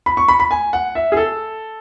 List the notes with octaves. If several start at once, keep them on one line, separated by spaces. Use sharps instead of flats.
B5
C#6
B5
B5
G#5
F#5
E5
G#4
A4